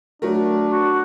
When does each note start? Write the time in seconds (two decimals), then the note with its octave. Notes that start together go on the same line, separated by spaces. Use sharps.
0.22 F#3 A3 D4 A#4
0.70 F#4